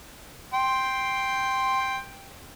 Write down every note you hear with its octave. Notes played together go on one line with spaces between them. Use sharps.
G5 C6